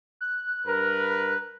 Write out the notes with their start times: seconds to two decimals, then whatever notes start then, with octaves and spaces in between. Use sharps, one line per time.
0.21 F#6
0.66 G2 A#4 B4